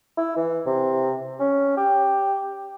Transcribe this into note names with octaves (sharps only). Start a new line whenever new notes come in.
E4
E3
C3
C#4
G4